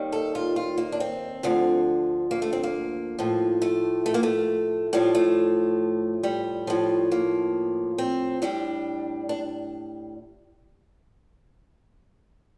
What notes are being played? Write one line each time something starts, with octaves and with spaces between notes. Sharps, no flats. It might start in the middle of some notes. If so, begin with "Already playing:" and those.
Already playing: D#2 D#3 G3
A4
F4
F4
A#3
D4
C4
D2 D3 F3
A#3
A3
C4
A#3
A2 F3
A3
A3
A#3
A3
A2 F3 G3
A3
G3
A2 F3
A#3
C4
A2 G3 D4
D4